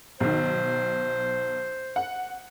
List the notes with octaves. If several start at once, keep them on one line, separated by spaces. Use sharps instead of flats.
B1 D#3 C5
F#5